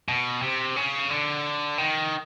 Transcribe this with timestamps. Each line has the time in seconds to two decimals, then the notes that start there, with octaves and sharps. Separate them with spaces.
0.09 B2
0.42 C3
0.76 C#3
1.10 D3
1.78 D#3